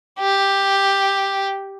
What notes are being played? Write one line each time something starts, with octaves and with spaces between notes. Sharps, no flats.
G4